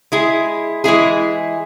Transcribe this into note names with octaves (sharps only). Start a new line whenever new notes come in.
G#3 E4 G#4
E3 G#3 E4 G#4